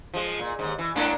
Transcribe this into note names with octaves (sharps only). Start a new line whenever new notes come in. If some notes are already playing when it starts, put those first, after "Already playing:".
F3 G#3
A#2
D#2 G#2
E3
G#2 A#3 D4